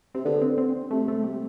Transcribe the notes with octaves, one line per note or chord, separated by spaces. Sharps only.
C3 C4
D3 B3
C4
C4
C3 A3
A3
G3